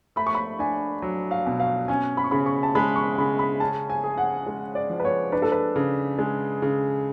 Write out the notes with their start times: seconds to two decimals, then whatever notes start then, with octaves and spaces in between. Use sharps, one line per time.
0.16 A3 B5
0.27 C#6
0.35 B5
0.59 D4 G#5
1.02 F#3
1.31 F5
1.46 B2
1.60 F5
1.88 C#4 G#5
2.17 B5
2.24 C#6
2.31 C#3 B5
2.46 C#6
2.63 A5
2.75 G#3 B5
2.96 C#6
3.18 C#3 B5
3.39 B5
3.60 C#4 A5
3.90 G#5
4.04 G#4
4.18 F#5
4.47 G#3
4.75 D5
4.90 F3
5.00 B4
5.05 C#5
5.32 D4 B4
5.42 A4
5.52 B4
5.76 C#3
6.19 G#3
6.62 C#3